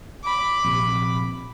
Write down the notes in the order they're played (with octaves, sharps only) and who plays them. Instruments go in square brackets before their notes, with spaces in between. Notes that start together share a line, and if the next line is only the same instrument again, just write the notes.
[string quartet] B5 D6
[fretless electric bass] A#1 C3